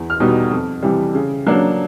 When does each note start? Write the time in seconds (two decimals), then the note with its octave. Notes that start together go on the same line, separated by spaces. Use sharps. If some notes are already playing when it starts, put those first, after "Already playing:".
Already playing: E2
0.10 F6
0.20 B2 G3 B3 D#4
0.51 F2
0.83 C3 E3 G3
1.15 C#3
1.47 F#3 A#3 D4